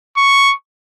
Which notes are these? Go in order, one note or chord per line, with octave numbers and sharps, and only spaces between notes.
C#6